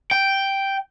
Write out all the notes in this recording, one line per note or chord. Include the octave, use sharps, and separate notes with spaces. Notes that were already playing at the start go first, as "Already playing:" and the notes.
G5